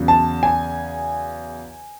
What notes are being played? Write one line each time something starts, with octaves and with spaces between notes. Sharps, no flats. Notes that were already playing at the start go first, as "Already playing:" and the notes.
Already playing: E2 C#3 F#3
A5
G#5